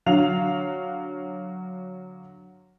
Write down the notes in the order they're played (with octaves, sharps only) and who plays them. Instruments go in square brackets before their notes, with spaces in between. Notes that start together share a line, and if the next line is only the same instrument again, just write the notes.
[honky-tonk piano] D3 F#3 F5 F7